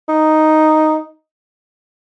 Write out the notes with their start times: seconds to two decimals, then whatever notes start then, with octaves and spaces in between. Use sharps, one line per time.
0.09 D#4